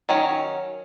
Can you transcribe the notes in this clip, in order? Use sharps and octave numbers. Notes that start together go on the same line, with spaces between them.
D#3 F#3 C#4